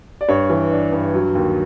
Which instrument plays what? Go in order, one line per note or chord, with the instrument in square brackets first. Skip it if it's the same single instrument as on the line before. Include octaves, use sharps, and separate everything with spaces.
[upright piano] D5
G2 C#5
E3
D4
G2
F#3
D#2